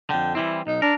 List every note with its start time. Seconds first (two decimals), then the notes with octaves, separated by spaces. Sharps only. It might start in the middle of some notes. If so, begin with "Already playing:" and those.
0.10 F2 D3 G5
0.35 E3 G3 C4 E4
0.67 B1 D#4
0.82 D4 A#4